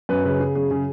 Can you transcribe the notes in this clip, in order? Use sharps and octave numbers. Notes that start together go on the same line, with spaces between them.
F#2 B4
C#3 B4
C#3 G#4
F#2 G#4
C#3